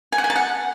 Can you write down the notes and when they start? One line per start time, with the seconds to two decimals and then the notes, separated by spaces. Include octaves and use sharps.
0.12 G#5
0.18 F#5
0.24 G#5
0.30 A5
0.36 F#5